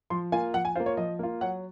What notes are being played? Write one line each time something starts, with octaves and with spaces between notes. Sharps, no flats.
F3 C6
A#3 F4 G#5
F3 F#5
G#5
A#3 F4 C5
C#5
F3 D#5
A#3 F4
F#3 F#5